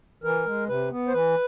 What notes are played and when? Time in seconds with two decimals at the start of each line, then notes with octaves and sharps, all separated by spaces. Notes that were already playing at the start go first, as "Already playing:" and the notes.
0.24 E3 A#4
0.46 G#3
0.68 C3 B4
0.91 B3
1.08 C5
1.13 E3 B4